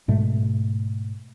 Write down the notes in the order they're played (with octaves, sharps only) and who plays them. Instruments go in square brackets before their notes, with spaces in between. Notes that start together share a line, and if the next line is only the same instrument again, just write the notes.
[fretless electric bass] G#2 B2 G#3 A3